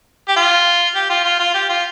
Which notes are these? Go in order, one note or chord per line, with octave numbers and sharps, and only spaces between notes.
G4
F4
G4
F4
F4
F4
G4
F4